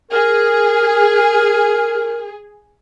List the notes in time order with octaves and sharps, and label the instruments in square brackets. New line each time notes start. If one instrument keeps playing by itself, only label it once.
[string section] G#4 [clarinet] A#4